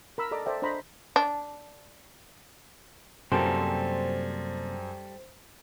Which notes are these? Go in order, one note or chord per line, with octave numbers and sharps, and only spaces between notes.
A#4 B5 E6
A4 D5 D#5 A#5 D6
A4 C5 D5 E5 G5
D4 C5 D#5 A#5 B5
D4
F#2 C3 F#3 G3 A#3 G4 A4 C5